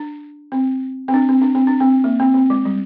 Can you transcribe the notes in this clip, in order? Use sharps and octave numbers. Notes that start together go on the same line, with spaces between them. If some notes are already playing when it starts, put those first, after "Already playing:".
Already playing: D4
C4
C4
D4
C4
D4
C4
D4
C4
A#3
C4
C4
G#3
G3